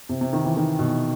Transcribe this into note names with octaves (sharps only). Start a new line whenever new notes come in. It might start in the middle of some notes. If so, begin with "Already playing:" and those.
C3
C3
D#3
E3
D#3
B2